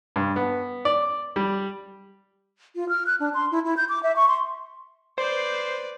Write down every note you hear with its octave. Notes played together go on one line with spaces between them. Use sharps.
G2
B3
D5
G3
F4
F6
F#6
D4
C6
E4
E4
G6
D6
E5
C#6
C6
B4 C5 D5